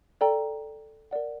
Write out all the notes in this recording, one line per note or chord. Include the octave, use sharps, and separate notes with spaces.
A4 D5 G5 A#5
A#4 D5 F#5